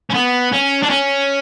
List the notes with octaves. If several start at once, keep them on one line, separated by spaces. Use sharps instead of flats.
C#4
B3
C#4
D4
C#4